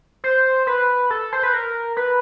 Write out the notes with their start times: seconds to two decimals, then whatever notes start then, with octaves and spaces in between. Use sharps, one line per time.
0.24 C5
0.67 B4
1.10 A4
1.33 C5
1.43 B4
1.53 A#4
1.97 B4